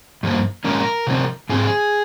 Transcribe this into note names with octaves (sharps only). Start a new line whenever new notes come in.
G2 F3 A#3
A#2 F3 G#3 C#4 A#4
C3 F3 C4
G#2 F3 C4 G#4